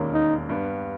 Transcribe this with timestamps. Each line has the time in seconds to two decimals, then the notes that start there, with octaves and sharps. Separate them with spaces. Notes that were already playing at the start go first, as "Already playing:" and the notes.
Already playing: E1 D#2 D#3 A#3 C#4
0.14 D#4
0.49 G2 G3 B3